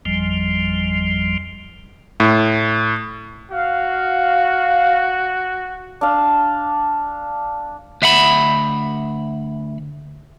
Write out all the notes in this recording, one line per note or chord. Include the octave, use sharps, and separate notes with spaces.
G#1 F2 F3 G3
A2
F#4 F5
D4 F5
D2 E5 F#5 B5